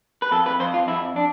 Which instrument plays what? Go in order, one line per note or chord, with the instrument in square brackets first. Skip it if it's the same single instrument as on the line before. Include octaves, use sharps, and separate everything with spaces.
[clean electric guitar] B4
F2 A4
B4
F2 C5
F4
F2 E4
D4